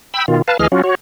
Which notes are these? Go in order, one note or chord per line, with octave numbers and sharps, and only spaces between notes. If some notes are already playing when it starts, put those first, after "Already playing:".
G5 B5 E6
B2 D#3 F4
B4 F5 A5
D2 E3 G#4 D#5 F6
F#3 C#4 F4 F#4
F#4 C#5